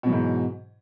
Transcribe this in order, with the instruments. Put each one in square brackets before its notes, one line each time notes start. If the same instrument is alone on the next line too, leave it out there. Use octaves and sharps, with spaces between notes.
[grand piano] B2
F#3
E3
G#2